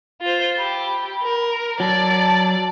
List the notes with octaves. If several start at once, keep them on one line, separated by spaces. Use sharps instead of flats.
F4 C5
G4 B5
A#4
F#3 D5 A5